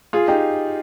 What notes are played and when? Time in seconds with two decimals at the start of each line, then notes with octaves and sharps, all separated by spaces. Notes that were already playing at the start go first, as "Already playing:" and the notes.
0.13 F4 G#4
0.28 D#4 G4